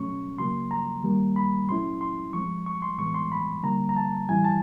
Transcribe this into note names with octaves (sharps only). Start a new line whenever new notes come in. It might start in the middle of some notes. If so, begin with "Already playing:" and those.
Already playing: B2 F#3 A3 C#4 C#6
C#3 F#3 A#3 C6
A#5
D#3 G3 A#3
B5
A#2 F#3 A3 C#4 E4 C6
C6
F3 G#3 C4 C#6
C#6
C6
A2 E3 G#3 B3 C#6
C6
B5
D3 G3 A#3 A#5
A#5
A5
A2 E3 G3 C4 E4 G#5
A5